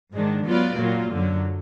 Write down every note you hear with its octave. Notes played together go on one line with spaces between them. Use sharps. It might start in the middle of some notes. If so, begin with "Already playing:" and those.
G#2 D#3 G#3 D4
F#3 B3 F4 B4 D5
A#2 F#3 A#3 F4
F#2 D3 F#3